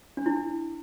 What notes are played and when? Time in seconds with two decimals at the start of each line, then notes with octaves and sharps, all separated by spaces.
0.17 D4
0.26 E4